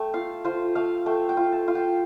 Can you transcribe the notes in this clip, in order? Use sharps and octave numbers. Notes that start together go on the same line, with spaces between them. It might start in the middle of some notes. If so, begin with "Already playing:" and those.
Already playing: A3 G5
F4 F5
F4 C5
A3 F5
A3 G5
G5
F4
A5
F4 F5
G5